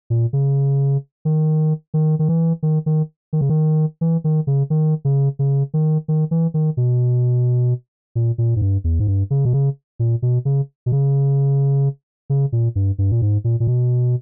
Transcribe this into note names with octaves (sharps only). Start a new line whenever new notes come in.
A#2
C#3
D#3
D#3
D#3
E3
D#3
D#3
D#3
C#3
D#3
E3
D#3
C#3
D#3
C#3
C#3
D#3
D#3
E3
D#3
B2
A#2
A#2
G#2
G2
E2
G#2
G2
C#3
B2
C#3
A#2
B2
C#3
B2
C#3
C#3
A#2
G2
G2
A#2
G#2
A#2
A#2
B2